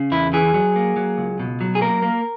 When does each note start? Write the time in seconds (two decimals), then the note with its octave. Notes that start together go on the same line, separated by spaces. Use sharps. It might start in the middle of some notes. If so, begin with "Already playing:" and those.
Already playing: C#3
0.11 E2 E4
0.33 E3 G#4
0.54 F#3
0.76 A#3
0.96 F#3
1.18 C#2
1.40 B2
1.61 F#3
1.75 G#4
1.81 A#3 A#4
2.02 A#3